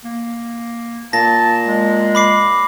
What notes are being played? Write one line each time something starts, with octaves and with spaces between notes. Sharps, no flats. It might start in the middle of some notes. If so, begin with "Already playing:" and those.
A#3
A#2 A5 A#6
G#3
B5 D6 C7